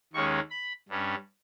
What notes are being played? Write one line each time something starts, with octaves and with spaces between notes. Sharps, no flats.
D#2 D#3 G#3 C#4 C#6
B5
G2 G3 C#4